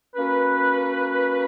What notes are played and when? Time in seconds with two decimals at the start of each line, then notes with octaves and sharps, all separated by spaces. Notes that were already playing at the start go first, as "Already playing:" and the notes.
0.15 A#3 C#4 F#4 B4